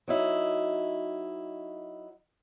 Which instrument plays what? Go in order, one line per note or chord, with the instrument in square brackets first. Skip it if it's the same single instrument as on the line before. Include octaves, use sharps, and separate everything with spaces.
[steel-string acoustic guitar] F#3 D#4 E4